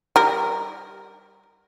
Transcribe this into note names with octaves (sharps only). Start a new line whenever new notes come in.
G3 A#4